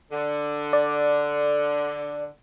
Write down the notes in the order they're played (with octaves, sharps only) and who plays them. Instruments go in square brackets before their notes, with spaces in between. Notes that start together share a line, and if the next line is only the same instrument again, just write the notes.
[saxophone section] D3
[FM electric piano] D5